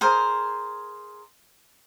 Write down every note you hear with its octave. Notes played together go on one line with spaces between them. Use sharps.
G#4 A#4 C5